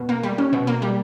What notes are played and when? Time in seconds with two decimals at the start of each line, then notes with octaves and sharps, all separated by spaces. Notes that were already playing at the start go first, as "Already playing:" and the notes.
Already playing: B2
0.09 A#3
0.23 G3
0.38 C#4
0.53 B2
0.67 A#3
0.82 G3